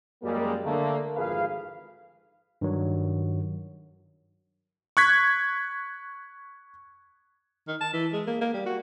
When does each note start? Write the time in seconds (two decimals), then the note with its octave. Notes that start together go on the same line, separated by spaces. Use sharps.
0.22 F#2 G3 G#3 A#3
0.64 D3 A3 A#3
1.16 G#1 F2 A3 G#4 B4 F5
2.61 G2 D#3 F#3
4.97 C#6 F#6 G#6 B6
7.67 D#3
7.81 A5
7.93 E3
8.13 G#3
8.27 A#3
8.41 A#3
8.54 G3
8.66 F#4